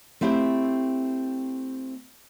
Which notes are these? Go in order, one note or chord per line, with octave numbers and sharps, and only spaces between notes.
A3 C4 E4 G4 C5